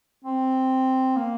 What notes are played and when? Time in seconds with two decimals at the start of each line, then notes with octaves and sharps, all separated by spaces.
0.24 C4
1.16 A#3